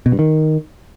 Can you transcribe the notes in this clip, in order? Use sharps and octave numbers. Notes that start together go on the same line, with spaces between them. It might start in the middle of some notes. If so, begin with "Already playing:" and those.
B2
G2
D#3